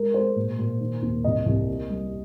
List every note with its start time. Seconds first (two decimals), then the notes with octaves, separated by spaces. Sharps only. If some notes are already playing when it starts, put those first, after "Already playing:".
Already playing: G#3 A#4
0.14 G#3 C5
0.36 A#2
0.59 A#2
0.81 D#3
1.02 D#2
1.24 C2 D#5
1.46 C2
1.68 A#3
1.90 G3